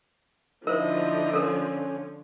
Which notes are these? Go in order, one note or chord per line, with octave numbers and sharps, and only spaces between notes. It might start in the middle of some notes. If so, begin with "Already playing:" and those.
D3 F3 D#4 E4 A#4 C5 D#5
C#4 A4 A#4